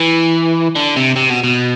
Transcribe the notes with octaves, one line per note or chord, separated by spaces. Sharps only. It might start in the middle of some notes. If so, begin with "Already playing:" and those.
Already playing: E3
D3
C3
C3
B2
B2